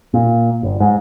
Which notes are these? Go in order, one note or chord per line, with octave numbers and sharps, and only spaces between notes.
A#2
G1
G#2